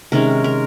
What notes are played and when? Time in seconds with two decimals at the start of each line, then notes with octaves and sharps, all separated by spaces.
0.12 C3 D#3 G#3 C#4 A#4
0.44 A#4